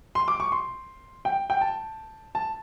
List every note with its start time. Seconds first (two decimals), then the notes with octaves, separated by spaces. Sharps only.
0.15 C6
0.28 D6
0.40 C#6
0.52 C6
1.25 G5
1.50 G5
1.61 A5
2.35 A5